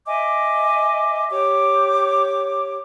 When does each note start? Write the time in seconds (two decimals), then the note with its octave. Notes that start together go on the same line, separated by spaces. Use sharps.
0.06 D#5 E5 G#5 D6
1.30 G4 C#5 D6